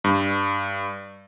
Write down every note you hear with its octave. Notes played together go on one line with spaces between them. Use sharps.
G2